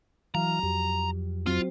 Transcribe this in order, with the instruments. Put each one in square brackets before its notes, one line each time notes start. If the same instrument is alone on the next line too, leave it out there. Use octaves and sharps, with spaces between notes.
[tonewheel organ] E3 F5 [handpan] F#3 [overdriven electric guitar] A#5
[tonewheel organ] F2 [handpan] G4
[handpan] F#3 C4 [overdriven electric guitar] F4